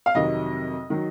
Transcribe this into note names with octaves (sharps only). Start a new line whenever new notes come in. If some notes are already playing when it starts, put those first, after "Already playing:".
F5
F2 C3 D#3 F#3 D#5
D#3 F#3